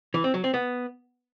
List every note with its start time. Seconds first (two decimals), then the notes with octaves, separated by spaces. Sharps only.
0.14 E3
0.24 C4
0.34 F#3
0.44 C4
0.54 B3